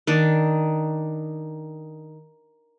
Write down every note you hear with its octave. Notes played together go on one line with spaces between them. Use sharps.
D#3 D4